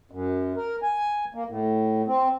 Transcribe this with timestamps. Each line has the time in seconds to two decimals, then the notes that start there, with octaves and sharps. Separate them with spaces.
0.11 F#2
0.56 A#4
0.82 G#5
1.35 A#3
1.49 A2
2.08 C4